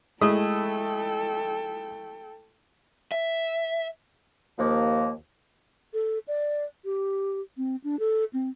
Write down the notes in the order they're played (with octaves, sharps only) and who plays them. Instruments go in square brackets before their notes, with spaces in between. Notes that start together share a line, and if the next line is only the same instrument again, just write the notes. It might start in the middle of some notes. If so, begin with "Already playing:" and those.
[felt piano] G#3 D#6 [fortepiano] A3 E4 [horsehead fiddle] A4 G5
[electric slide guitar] E5
[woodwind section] D#2 F3 A#3
[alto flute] A4
D5
G4
C4
D4
A4
C4